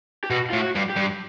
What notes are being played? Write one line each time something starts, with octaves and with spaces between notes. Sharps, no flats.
G4
B2 F#4
A2 F4
F#4
G2
G4
G2